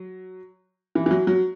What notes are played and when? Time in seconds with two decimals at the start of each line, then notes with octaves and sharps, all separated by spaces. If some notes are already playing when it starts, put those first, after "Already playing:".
Already playing: F#3
0.95 E3
1.06 E3
1.11 F#3
1.27 F#3